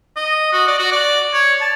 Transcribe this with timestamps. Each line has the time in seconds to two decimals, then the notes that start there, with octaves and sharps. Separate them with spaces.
0.16 D#5
0.53 F#4
0.67 D5
0.79 F#4
0.92 D5
1.33 C#5
1.61 A5